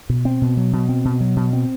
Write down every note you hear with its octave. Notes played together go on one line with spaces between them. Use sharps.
B2
C4
B2
F#3
B2
C4
B2
F#3
B2
C4